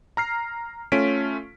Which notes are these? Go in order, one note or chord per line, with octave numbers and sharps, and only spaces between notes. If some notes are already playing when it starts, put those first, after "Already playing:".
A#5 F6 C7
A3 C#4 F4 B6 D7